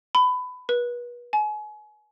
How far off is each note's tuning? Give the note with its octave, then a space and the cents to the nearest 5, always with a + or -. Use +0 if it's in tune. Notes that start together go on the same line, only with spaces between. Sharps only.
B5 +20
B4 -35
G#5 +35